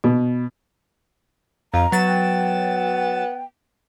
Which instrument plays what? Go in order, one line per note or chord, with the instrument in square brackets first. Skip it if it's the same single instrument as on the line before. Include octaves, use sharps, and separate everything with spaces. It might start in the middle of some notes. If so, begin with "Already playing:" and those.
[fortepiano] B2
[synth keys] F2 [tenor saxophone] F4 [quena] A#5
[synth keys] F#3 A6 E7 [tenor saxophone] B3
[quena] G5